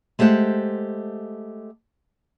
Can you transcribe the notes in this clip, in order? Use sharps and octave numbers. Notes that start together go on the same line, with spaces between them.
G#3 A3 G4 C5 F#5